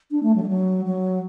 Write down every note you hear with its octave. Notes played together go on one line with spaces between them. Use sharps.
D4
A3
F#3
G3
F#3
F#3